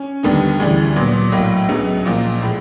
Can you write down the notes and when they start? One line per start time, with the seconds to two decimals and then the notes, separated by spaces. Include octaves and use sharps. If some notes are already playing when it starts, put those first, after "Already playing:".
Already playing: C#4
0.23 D#2 D3 G3 B3 D#4
0.60 D2 C#3 E3 G3
0.96 A#2 F#3 B3
1.32 B1 A2 F#3 A#3
1.69 C#2 C#3 F#3 B3
2.05 B1 A#2 F3 A#3
2.43 A2 F3 G#3